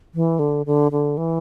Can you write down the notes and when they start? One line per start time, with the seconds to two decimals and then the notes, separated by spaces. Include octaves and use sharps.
0.15 E3
0.39 D3
0.66 D3
0.92 D3
1.17 E3